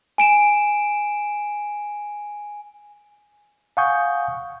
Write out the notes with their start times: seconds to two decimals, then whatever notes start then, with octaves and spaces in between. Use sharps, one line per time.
0.18 G#5 D7 E7
3.77 F5 F#5 G#5 C#6 D#6 G6